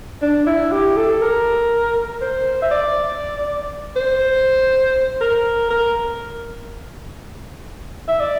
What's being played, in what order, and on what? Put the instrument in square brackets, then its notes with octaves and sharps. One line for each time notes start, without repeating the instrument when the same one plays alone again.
[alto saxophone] D4
E4
G4
A4
A#4
C5
E5
D5
C5
A#4
A#4
E5
D5